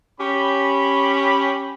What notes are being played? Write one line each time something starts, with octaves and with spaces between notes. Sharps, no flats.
C#4 G4 B5